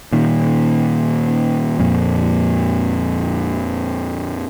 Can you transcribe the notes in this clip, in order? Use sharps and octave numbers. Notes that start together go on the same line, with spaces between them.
A#2 D#3
F2 A#2